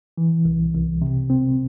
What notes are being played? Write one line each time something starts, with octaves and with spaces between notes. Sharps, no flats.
E3
C2
C2
C3
C4